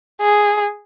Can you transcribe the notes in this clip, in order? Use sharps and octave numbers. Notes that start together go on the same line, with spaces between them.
G#4